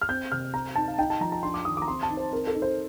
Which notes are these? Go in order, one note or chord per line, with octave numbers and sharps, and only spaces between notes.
F6
C4 G6
C3 F6
C4 A#5
D#4 A5
F5
D#4 G5
A5
F3 A#5
A#5
D4 C6
D6
D#3 D#6
D6
A#5
C4 C6
A5
D#4
C5
C4 A#4
A4
D#4
C5